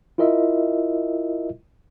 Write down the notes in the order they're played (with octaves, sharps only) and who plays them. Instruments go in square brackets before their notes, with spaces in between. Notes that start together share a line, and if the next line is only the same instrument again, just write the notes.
[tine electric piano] E4 F4 A#4 D#5 E5